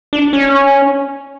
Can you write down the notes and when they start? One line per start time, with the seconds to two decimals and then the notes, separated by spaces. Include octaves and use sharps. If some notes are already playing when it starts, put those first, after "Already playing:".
0.13 D4
0.33 C#4